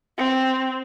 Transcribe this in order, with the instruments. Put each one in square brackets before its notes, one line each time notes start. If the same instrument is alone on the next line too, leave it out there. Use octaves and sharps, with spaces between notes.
[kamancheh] C4